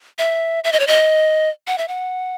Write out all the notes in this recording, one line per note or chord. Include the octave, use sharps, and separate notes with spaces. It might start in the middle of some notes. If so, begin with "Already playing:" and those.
E5
E5
D#5
C#5
D#5
F#5
E5
F#5